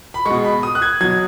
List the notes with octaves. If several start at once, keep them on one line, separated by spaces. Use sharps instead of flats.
B5
B2 G#3 C#6
B5
D#6
F#6
G#6
B2 F#3 G#6